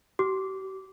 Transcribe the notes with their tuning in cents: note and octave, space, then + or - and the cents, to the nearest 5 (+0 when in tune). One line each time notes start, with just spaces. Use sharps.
G4 -45 D6 -15